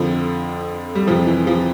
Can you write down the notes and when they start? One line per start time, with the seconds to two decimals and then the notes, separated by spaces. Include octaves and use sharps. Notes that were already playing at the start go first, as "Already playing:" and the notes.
Already playing: F2 D3 F3
0.95 G3
1.07 F2 C3 E3 F3
1.27 E3
1.47 F3